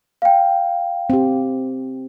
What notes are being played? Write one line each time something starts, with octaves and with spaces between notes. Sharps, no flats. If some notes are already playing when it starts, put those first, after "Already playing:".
F5 G5
C4 G4